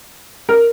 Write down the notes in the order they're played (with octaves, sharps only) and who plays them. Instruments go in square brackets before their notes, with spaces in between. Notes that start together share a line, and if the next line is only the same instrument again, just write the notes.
[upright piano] A#4